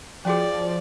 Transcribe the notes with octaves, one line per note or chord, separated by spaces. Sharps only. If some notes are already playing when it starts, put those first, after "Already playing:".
F3 C#4 F#4 G#4 D5